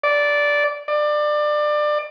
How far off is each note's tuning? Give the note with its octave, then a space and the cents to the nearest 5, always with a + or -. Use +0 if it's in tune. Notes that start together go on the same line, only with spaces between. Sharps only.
D5 -10
D5 +25